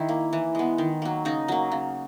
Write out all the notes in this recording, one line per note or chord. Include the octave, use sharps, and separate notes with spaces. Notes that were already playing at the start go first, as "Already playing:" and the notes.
Already playing: D#3 E4
A#3
E3
G#3 B3
D#3
F#3 A#3
C#3 D#4
F#3 A#3
C#3